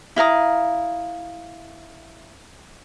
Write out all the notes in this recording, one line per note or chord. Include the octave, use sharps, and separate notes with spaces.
E4 F5 A#5 D#6